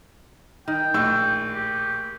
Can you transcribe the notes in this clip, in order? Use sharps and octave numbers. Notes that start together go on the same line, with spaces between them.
D#3 G5
A#1 A2 E6
G4